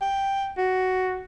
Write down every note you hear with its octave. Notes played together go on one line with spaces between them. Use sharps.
G5
F#4